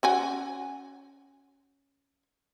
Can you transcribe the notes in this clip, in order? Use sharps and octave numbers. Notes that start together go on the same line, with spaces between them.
C#4 F#4 G#5